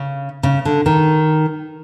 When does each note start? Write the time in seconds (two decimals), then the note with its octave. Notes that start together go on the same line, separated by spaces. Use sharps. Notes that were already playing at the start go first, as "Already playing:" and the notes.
Already playing: C#3
0.43 C#3
0.65 D3
0.86 D#3